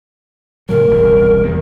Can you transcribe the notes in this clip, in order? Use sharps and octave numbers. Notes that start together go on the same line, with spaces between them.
A2 C#3 F#3 A#4
E1 C2 F#2
E2 C3 D#3